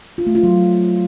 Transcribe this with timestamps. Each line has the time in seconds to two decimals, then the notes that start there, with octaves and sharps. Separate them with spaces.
0.18 F4
0.27 A3
0.35 F4
0.43 F#3